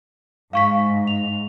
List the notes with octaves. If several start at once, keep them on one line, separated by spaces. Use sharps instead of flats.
G#2 F5 C#6 B6
F7